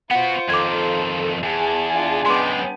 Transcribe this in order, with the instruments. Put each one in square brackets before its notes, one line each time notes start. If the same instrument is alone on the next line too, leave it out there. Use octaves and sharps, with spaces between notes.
[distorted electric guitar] B3 F#4 [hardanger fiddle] F4 C5 [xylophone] F#5
[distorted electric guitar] F2 D#3 [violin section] A4 [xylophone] D6 G#6
[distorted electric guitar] E2 [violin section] G#4 G#5 A5
[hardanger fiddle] D4 F4
[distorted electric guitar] F#2 G#3 [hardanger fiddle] B3 G5 [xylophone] C6 D6